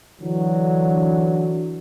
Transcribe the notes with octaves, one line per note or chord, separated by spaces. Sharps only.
D3 E3 F#3 D4